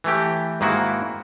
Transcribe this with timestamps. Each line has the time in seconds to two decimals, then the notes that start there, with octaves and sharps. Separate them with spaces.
0.04 E3 A3 G4
0.61 G#2 D#3 A#3 E4 F#4